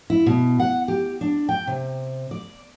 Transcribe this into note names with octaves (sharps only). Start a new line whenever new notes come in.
E4
B2
F#5
G4
D4
G5
C3
D5